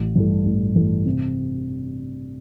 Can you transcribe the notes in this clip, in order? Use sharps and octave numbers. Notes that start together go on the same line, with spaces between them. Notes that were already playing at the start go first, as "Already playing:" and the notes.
Already playing: A1
G2 E3 A3
A1
G2 E3 A3
C3